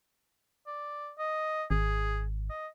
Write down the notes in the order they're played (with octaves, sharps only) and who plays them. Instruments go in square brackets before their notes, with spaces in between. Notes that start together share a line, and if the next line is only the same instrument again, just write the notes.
[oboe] D5
D#5
[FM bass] G#1 [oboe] G#4
[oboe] D#5